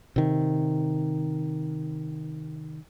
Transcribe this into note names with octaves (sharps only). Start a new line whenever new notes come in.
C3 D#3